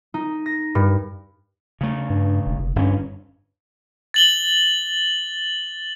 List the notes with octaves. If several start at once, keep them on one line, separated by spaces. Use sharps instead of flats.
D#4
A#6
G2
C#3 A3
G2
E1
F1
G1 G2 C#4
A6 F#7 G7